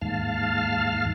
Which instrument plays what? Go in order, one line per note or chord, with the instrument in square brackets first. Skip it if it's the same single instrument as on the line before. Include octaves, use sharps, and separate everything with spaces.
[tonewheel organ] D#2 G#2 F5 A5 F6